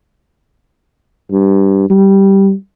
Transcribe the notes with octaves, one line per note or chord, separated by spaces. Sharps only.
G2
G3